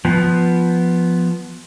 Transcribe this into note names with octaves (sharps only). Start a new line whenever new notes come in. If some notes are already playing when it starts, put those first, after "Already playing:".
F3 B3